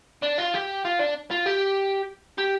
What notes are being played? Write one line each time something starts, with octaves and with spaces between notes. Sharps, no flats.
D4
F4
G4
F4
D4
F4
G4
G4